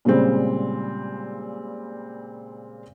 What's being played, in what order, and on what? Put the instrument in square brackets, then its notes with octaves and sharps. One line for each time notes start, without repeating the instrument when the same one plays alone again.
[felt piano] A#2 C#3 G3 G#3 C4